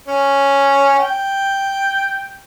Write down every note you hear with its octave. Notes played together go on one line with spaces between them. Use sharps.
C#4
G5